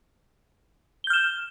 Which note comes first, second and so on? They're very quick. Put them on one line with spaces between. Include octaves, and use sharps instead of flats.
G7 G6 F6 E7